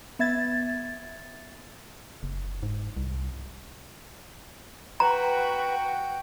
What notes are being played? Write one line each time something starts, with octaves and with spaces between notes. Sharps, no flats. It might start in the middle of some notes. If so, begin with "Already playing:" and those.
B3 E5 G#6 A6
F#1
G#2
C2
F#4 B4 G5 A#5